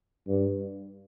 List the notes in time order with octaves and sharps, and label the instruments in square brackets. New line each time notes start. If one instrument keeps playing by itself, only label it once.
[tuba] G2